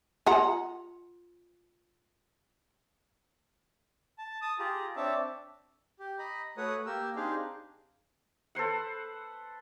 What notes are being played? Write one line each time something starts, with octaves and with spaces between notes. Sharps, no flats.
F4 F#5 A#5
A5
A5 D#6
F4 G4 G#4 A#5
C4 D4 C#5 E5 A5
G4
D#5 A#5 B5
A3 F#4 B4 C#5 D#6
A#3 G4 A#4 E6
C4 D4 D#4 G4 G#4 F5
A4 B4 C5 F#5